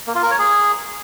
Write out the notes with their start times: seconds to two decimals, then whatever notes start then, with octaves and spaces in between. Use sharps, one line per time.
0.07 A#3
0.15 F4
0.23 A#4
0.31 C#5
0.39 G#4